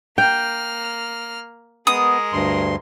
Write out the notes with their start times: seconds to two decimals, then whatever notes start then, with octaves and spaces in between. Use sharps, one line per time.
0.18 A#3 G5 F6
1.87 G#3 B3 A#4 D#6
2.33 D2 G2 C6